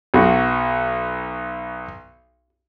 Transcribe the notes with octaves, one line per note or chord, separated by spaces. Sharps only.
B1 F#4